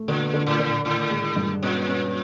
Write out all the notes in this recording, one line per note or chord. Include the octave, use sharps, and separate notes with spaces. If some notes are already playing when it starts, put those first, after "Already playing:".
Already playing: A3
A#2 D3
D3
A2
D3
A2 D#3
G#3
G2
A#2 C#4
C#4